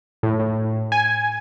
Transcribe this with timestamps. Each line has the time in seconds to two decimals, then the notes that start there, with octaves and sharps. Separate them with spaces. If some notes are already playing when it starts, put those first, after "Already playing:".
0.23 A2
0.40 A2
0.92 G#5